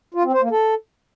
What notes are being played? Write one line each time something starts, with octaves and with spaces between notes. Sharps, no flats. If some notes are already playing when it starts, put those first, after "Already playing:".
F4
C4
C5
A#3
A4